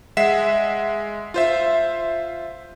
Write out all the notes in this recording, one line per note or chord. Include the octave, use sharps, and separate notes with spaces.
G#3 E5 F#5 B6 C7 E7
F4 C5 E5